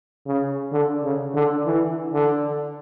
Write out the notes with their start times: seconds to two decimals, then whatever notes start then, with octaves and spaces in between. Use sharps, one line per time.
0.26 C#3
0.72 D3
1.03 C#3
1.34 D3
1.66 E3
2.12 D3